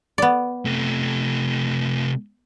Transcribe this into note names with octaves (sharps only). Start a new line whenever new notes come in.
B3 D5
C3 A3